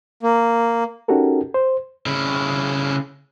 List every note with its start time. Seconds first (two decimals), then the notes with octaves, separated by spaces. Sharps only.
0.23 A#3
1.08 C#4 D#4 F#4 G4 A4 A#4
1.54 C5
2.06 C#3 E4